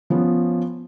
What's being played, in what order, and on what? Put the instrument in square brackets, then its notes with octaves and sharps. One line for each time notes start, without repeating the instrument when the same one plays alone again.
[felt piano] F3 B3 C#4